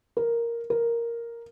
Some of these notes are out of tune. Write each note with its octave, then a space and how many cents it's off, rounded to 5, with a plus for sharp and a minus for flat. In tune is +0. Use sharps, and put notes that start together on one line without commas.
A#4 +0
A#4 +0